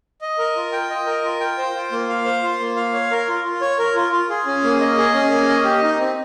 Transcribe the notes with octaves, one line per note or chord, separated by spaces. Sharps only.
D#5
A#4
F4
G5
D#5
A#4
F4
G5
C5
F4
A#3
F5
C5
F4
A#3
F5
C#5
A#4
F4
F4
C#5
A#4
F4
F4
G#4
C#4
A#3
D#5
G#4
C#4
A#3
D#5
G4
D#4
C4